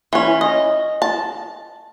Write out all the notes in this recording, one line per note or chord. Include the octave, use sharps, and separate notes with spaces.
E3 C#4
D#5
A5